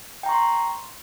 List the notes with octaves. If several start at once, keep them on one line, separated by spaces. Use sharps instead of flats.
G5 A#5 C6 C#6